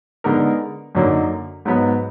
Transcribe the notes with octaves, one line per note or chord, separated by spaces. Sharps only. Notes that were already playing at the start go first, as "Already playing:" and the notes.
D3 G#3 B3 D#4 A#4
F#2 D3 F#3 A#3 D#4
G#2 F#3 B3